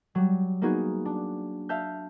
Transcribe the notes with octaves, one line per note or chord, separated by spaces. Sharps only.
F#3 G3
A#3 B3 D#4 F#4 G#4
D4
E5 F5 A5 F6 G6